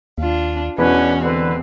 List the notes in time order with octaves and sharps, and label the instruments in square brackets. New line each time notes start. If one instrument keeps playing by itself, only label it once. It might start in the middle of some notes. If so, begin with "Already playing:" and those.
[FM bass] D#2 [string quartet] D4 F4
[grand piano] E1 [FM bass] E3 [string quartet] C#4 F#4 [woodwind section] D4 E4 B4
[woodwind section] D3 B4 [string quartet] C4